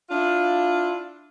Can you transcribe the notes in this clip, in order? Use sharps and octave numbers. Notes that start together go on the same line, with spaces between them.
D4 E4 F4